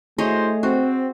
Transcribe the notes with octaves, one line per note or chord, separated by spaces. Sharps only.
A3 E4 F#4 G#4 C5 C#5 D#5
C4 F#4